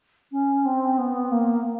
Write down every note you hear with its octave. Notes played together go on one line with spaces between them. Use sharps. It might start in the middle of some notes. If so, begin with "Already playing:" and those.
C#4
C4
B3
A#3